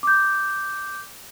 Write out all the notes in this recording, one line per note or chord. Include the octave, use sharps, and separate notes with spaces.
D6 G6